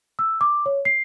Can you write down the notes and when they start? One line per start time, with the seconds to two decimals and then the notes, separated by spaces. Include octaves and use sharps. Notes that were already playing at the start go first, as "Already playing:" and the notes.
0.19 E6
0.41 D6
0.66 C#5
0.85 C7